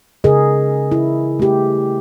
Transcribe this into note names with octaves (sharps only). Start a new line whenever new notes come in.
C#3 G#4 A#4 D#5
E4
A3 G4